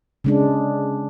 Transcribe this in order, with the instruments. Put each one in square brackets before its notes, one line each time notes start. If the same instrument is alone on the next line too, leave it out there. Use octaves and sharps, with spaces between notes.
[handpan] C#3 G#3 D4